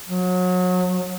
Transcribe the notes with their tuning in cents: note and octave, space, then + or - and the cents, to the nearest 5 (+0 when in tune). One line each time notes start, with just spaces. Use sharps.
F#3 -30